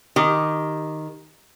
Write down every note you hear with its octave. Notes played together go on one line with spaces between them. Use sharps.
D#3 G4